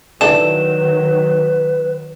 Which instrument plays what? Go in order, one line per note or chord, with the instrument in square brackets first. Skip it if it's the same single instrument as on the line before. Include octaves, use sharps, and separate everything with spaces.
[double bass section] D#3 F#3 [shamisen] D4 E4 A4 [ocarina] B4 [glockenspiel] E7